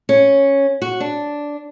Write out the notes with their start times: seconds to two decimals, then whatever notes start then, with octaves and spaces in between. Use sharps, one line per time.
0.09 C#4
0.82 F#4
1.00 D4